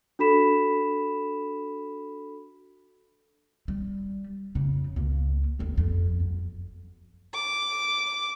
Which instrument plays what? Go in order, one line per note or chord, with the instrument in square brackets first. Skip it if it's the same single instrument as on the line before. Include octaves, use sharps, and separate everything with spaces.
[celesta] D4 F#4 A4 B5 B6 E7
[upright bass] G3
F2 C#3
C#2 A#3
G1 D#2
F2
F#2
[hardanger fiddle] D6